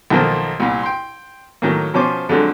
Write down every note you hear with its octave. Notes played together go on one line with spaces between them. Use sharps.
B1 D#3 F3 A3 A#3 A5
C2 A#2
G5 C6
A2 D#3 F#3 A#3
B2 F3 C#4 C5 D6
F2 D3 F#3 G#3